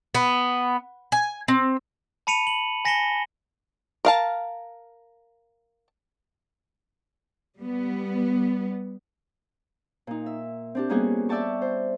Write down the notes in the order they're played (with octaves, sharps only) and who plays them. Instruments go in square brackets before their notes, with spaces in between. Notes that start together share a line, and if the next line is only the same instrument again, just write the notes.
[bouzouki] B3
G#5
C4
[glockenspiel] A5 B5 C#7 D#7 F7
F#7
G#5 A#6 B6 C#7 E7 G7
[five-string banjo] A#4 F5 A5
[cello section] G3 B3
[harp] A#2 D#4
E5
C4 D4 G4
G3 A#3 B3 C#4 F#4 G#4
D5 E5 G5 A5 C#6
C5